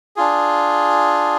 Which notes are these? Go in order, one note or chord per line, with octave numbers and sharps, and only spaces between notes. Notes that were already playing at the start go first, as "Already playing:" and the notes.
D4 F4 G#4